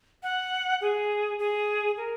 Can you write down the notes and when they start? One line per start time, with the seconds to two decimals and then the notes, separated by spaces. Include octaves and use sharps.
0.23 F#5
0.81 G#4
1.39 G#4
1.97 A#4